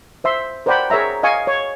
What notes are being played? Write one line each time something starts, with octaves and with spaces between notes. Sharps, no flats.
C5 E5 C6
A#4 C5 D5 F#5 G5 B5
G#4 A#4 C#5 E5 A#5
D#5 F5 G#5 C#6
C#5